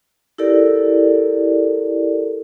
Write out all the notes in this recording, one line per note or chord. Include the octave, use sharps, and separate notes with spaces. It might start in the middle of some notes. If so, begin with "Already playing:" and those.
E4 G4 A4 A#4 D5